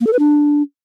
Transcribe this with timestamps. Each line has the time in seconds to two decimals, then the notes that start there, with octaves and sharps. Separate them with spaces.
0.01 A#3
0.07 A4
0.13 B4
0.19 D4